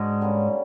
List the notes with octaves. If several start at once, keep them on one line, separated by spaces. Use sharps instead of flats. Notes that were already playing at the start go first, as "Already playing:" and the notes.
Already playing: G#2 G#3 D4 F#4
D3 G3 A#3 C#4